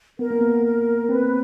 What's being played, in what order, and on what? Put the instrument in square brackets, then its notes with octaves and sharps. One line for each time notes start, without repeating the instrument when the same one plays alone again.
[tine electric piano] B3 [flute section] A#4
[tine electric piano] A#3
B3
[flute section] A#4
[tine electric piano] C4 [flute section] B4